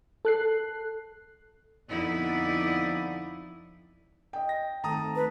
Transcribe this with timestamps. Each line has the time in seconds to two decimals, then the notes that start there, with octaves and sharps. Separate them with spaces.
0.25 A4 F#6 C7
1.89 F2 D3 B3 D#4 E4 D5
4.33 D#5 G5
4.49 A#6
4.84 D#3 A3 C4 A5 A#5 D#6
5.16 B4